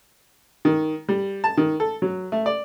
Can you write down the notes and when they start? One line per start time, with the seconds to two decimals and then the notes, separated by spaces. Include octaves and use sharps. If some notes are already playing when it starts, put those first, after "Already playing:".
0.65 D#3
1.08 G3
1.44 A5
1.57 D#3
1.80 A4
2.02 F#3
2.32 A3
2.46 D5